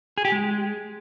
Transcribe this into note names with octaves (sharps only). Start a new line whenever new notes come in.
G#4
G4
G#3